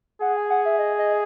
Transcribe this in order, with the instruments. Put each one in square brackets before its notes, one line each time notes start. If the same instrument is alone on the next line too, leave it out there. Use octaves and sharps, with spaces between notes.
[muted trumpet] G#4 [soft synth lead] F#5
[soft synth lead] G#5
F#5
E5
D#5
D#5